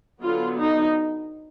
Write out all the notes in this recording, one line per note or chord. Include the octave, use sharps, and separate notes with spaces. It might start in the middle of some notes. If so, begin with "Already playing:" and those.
D3 F#3 B3 F4
D#4